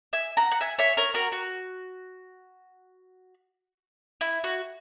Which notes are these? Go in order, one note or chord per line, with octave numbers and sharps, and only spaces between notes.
E5 G#5
F#5 A#5
F#5
E5 G#5
C#5 E5
A#4 C#5
F#4 A#4
F#4
E4
F#4